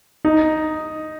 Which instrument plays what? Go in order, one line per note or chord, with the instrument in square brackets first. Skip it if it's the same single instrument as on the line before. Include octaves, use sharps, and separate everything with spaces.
[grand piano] D#4